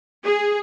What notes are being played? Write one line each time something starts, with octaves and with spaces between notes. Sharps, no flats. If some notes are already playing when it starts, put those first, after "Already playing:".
G#4